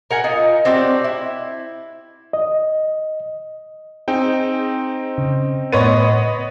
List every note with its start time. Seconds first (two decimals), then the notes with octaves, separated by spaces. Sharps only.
0.11 A#4 F#5 G#5
0.24 D#4 F4
0.65 C4 D4 F#4 G4
1.04 E4
2.33 D#5
4.08 C4 D#4 G#4 G5
5.18 C#3
5.72 A2 B3 C#5 D#5 C6 A6 D#7